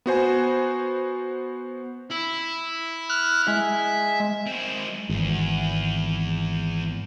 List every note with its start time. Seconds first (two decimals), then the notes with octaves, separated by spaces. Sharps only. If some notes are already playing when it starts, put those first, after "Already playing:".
0.06 B3 F#4 C5 G#5
2.10 E4
3.10 F6 F#6
3.48 G#3 E5
4.47 G#3 C4
5.09 G#1 E2